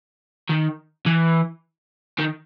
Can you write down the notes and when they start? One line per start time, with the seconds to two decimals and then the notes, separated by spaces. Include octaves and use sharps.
0.50 D#3
1.06 E3
2.18 D#3